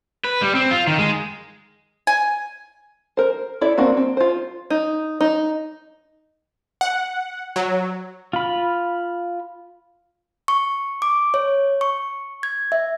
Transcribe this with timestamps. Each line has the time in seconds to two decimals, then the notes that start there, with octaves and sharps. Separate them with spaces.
0.24 B4
0.42 G3
0.55 C4
0.71 F4
0.87 D#3
0.99 G#3
2.07 G#5
3.17 A#4 C5
3.61 E4 A4 D5
3.77 A#3 C4 D4 F#4
3.97 C4
4.17 F4 C5
4.70 D#4
5.21 D#4
6.81 F#5
7.56 F#3
8.33 F4 B5
10.48 C#6
11.02 D6
11.34 C#5
11.81 C#6
12.43 G#6
12.72 E5